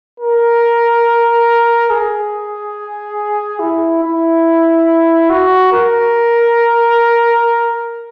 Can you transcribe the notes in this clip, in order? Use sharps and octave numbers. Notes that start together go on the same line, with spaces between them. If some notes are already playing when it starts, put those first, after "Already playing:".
A#4
G#4
E4
E4
F#4
A#4